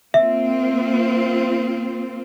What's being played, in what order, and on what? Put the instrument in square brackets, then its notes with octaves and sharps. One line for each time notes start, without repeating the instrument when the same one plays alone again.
[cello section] A#3 C4 F4 [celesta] E5